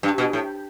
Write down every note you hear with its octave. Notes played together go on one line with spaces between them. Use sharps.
G2
B2
A2